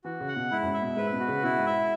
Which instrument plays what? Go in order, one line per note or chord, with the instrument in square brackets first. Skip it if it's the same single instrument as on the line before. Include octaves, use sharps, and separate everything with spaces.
[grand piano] E3 [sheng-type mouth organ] F#4
[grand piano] C#3
[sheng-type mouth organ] F#5
[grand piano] B2
[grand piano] G#2 [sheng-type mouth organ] E4
[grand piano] F#2
G#2
[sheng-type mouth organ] E5
[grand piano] B2
[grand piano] G#2 [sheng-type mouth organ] B4
[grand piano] B2
[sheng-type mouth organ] F#4
[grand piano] C#3
[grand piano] B2 [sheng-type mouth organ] E4
[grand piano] G#2
[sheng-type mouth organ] E5